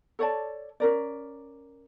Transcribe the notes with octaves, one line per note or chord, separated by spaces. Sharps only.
A4 C#5 D5 A5
C#4 A#4 D5